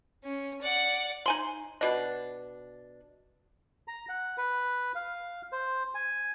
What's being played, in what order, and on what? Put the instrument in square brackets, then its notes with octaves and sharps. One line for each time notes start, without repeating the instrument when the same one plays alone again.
[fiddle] C#4
D5 F#5
[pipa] D#4 G#5 C6 [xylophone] F#7
[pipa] B2 D4 [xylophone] D#5
[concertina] A#5
F#5
B4
F5
C5
G#5